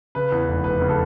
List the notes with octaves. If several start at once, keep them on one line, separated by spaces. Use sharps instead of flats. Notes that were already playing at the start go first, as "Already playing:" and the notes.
C#3 B4
E2
F1
F1 B4
C#3
A4